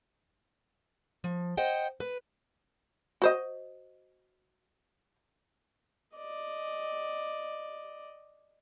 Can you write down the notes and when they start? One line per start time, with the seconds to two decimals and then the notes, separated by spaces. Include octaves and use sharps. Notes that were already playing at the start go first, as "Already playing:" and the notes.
1.24 F3
1.57 C5 D#5 F#5 G5
2.00 B4
3.22 F#4 C5 D#5
6.16 D5 D#5